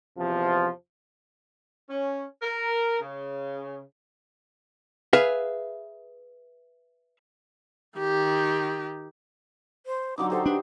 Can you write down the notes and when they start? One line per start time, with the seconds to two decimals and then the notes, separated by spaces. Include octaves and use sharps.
0.18 E2 C3 F3
1.90 C#4
2.42 A#4
3.00 C#3
5.13 G#4 B4 E5 F5
7.99 D#3 G4
9.86 C5
10.18 D3 F#3 D#4 D6
10.30 G4 A4 C5
10.46 D4 B4